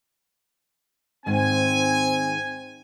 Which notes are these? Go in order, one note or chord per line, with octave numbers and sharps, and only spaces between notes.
G#2 D#3 C4 G#5